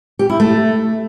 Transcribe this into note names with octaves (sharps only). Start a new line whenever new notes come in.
G4
E4
A3